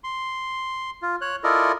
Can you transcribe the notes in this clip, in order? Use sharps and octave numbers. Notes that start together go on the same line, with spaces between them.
C6
F4
C#5 F#6
E4 F4 A4 A#4 D5 D#5